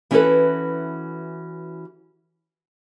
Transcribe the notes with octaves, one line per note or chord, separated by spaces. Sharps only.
E3 C#4 E4 F#4 A4 B4